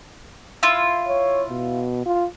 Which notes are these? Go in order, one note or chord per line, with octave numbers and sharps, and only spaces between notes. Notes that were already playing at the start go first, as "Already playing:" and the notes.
E4 F4
C#5
B2
F4